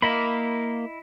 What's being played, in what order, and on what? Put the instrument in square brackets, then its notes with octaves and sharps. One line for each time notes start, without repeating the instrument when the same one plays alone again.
[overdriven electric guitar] A#3 A#4 [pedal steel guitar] E4 D#5 B5